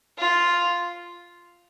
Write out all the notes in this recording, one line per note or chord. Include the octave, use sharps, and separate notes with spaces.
F4